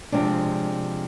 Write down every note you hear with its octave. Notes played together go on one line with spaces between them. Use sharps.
C3 F3 G#3 D4